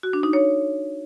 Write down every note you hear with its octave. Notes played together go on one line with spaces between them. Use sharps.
F#4
D4
D#4
C#5